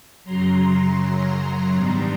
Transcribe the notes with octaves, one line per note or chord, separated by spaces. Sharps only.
F#2 C#3 F#3 A#5 C6
G#2 D#3 G3 B3 D4 A#5 C6